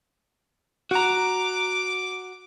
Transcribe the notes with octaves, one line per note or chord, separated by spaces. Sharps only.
F#4 A#5 D6